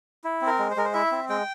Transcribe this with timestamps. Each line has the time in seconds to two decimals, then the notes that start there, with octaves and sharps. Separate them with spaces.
0.24 E4
0.42 C4
0.47 A#4
0.59 G#3
0.71 C5
0.76 G#3 A#4
0.85 C5
0.93 E4 E5
1.12 C4
1.29 G#3 G5